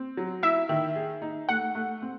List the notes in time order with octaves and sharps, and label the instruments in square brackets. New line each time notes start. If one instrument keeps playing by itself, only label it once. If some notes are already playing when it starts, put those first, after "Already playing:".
Already playing: [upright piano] C4
F#3
[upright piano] E4 [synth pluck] E5
[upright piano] D#3
G#4
D#4
[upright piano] A3 [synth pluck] F#5
[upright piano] A3
C4